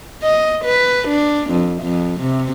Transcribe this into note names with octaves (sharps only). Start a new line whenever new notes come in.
D#5
B4
D4
F2
F2
C3